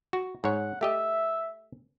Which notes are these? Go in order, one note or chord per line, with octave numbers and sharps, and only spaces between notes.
F#4
G#2 C#5 F#5
A3 G4 D#5 E5